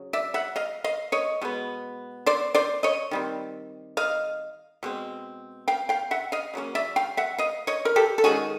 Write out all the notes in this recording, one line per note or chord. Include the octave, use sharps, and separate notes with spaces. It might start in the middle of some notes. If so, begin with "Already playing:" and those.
Already playing: C#3 F#3
D5 E5
E5 F#5
D#5 F5
D#5 F5
C#5 D#5
B2 G#3 B3
C5 D5
C5 D5
C#5 D#5
D#3 G3 C4
D#5 F5
B2 G#3 C4
F5 G5
F5 G5
E5 F#5
D#5 F5
C#3 F#3 A#3 C#4
D5 E5
F5 G5
E5 F#5
D#5 F5
C#5 D#5
A#4
G4 A4
A4
D#3 G#3 C#4 F#4 G#4